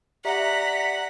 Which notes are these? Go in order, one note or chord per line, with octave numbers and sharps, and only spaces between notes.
G4 D5 E5 F#5 A#5 B6